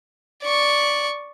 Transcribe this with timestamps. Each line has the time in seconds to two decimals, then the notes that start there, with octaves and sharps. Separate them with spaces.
0.42 D5 C#6